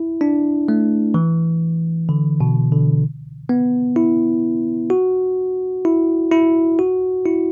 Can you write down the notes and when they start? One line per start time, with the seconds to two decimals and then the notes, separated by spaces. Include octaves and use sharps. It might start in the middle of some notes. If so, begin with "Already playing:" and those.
Already playing: E4
0.21 D4
0.68 A3
1.14 E3
2.09 D3
2.41 B2
2.72 D3
3.49 B3
3.96 E4
4.90 F#4
5.85 E4
6.31 E4
6.79 F#4
7.25 E4